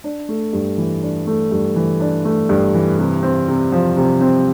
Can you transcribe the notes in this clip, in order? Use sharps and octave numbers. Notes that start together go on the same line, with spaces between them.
D4
A3
G2
E3
D4
A3
G2
E3
D4
A3
G2
E3
C3
C4
C3
F3
C3
C4